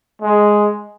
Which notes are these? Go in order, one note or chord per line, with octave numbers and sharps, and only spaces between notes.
G#3